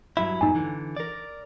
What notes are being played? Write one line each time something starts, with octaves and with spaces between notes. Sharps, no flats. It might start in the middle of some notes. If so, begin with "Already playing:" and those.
G2 F#3 E4 E5
E2 G2 A#2 D#4 G#5
D3 E3
A#4 D5